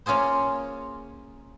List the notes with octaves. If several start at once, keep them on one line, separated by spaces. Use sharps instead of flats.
A#3 C#4 F4 G#4 C5